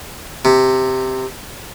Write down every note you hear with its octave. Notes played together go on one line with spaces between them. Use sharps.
C3